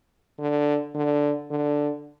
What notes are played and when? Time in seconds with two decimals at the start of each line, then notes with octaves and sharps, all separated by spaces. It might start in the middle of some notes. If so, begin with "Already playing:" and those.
0.39 D3
0.95 D3
1.50 D3